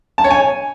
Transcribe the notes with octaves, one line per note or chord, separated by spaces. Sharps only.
A5
C#5
G#5